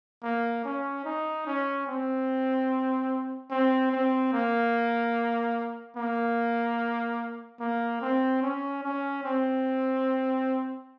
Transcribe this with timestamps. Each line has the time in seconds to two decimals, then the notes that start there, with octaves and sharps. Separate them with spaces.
0.23 A#3
0.64 C#4
1.05 D#4
1.46 C#4
1.87 C4
3.51 C4
3.91 C4
4.33 A#3
5.96 A#3
7.60 A#3
8.01 C4
8.42 C#4
8.83 C#4
9.23 C4